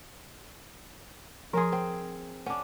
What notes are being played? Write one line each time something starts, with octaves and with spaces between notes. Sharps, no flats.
F3 G#4 A#4 G#5 C6
C4
C#4 D4 F#5